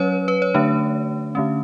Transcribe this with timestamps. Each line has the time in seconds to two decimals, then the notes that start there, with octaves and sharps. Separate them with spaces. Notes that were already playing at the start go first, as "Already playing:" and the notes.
Already playing: F#3 C#4 B4 C#5
0.28 B4
0.42 C#5
0.54 D3 A3 D4
1.35 D3 A3 C#4